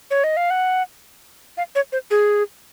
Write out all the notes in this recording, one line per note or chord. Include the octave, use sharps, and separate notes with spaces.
C#5
D#5
F5
F#5
F5
C#5
C5
G#4